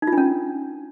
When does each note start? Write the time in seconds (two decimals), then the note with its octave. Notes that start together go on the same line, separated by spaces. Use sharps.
0.02 D#4
0.07 F4
0.12 D4
0.18 C#4